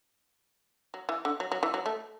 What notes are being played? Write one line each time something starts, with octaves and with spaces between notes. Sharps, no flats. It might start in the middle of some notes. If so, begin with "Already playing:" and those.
F#3
E3
D3
F#3
F#3
E3
F#3
A3